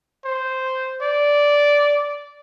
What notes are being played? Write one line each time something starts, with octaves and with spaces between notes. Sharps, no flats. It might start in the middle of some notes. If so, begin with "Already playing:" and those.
C5
D5